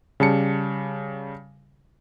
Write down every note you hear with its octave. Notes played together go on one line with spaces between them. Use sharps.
C#3 G3 A5 C#7